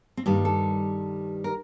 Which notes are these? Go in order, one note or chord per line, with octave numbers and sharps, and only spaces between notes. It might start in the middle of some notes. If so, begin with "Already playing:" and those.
C4
G2 D#3 G3 A#3
A4
A#4